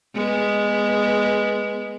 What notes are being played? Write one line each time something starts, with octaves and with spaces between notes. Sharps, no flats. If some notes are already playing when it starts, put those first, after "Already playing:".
G#3 B3